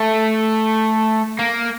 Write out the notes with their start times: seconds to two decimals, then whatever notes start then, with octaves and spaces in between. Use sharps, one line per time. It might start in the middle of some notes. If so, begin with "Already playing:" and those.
Already playing: A3
1.39 A#3